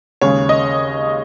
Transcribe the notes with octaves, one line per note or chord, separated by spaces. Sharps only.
D#2 C#3 G#3 C#4 G#4 C#5
D#5